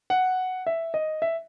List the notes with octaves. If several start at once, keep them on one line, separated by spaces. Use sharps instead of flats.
F#5
E5
D#5
E5